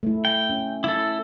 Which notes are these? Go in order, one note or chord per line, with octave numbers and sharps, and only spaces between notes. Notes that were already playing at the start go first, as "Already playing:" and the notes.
A3 E4
G5
C#4
E4 A4